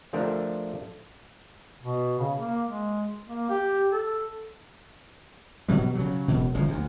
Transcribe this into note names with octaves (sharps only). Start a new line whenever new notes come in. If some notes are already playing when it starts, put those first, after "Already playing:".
F3 A3 D4 A#4
B2
C#3
A#3
G#3
A#3
G4
A4
B2 F#3 G3
C#3 F#3
E1 B2
G1 C#3 F3
D2